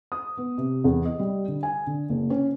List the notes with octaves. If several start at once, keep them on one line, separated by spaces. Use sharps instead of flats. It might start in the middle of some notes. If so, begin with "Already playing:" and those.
D#6
B3
C3
E2
D#5
G3
D3
G#5
D3
F#1
C#4